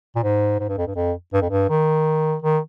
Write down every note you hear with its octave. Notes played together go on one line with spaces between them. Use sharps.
A#2
G#2
G#2
G2
F2
G2
F2
G2
F2
G2
D#3
D#3